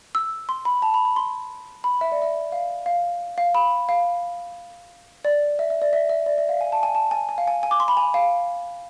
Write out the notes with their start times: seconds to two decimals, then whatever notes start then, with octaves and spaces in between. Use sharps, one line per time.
0.15 E6
0.49 C6
0.65 B5
0.82 A5
0.94 B5
1.05 B5
1.16 C6
1.84 B5
2.01 E5
2.12 D5
2.22 E5
2.52 F5
2.86 F5
3.38 F5
3.55 B5
3.89 F5
5.25 D5
5.59 E5
5.70 E5
5.82 D5
5.93 E5
6.09 E5
6.26 D5
6.38 E5
6.49 F5
6.61 G#5
6.72 A5
6.83 G#5
6.95 A5
7.11 G#5
7.29 G#5
7.38 F5
7.48 G#5
7.63 G#5
7.71 D6
7.80 C6
7.88 B5
7.97 G#5
8.14 F5